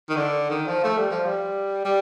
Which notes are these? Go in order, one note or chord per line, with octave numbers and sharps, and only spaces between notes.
D#3
D3
D#3
F3
A3
G3
F3
G3
G3